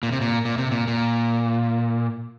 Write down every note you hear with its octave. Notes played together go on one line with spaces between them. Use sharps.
A#2
C3
A#2
A#2
C3
A#2
A#2